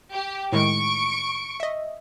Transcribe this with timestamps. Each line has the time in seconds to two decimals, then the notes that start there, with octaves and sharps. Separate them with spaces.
0.12 G4
0.53 A2 D#3 G#3 C#6 D7
1.60 D#5 E5